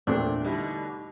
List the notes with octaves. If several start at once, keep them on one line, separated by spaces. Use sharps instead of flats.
A#1 E2 A#2 A3 C4 D4
B2 D3 G3 D#4 E4